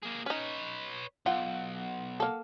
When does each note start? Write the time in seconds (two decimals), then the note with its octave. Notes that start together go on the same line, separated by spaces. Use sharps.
0.03 A#3 G#4
0.26 C#4 D#4 B4 C#5
1.26 B1 F4 F#5
2.20 A#3 A4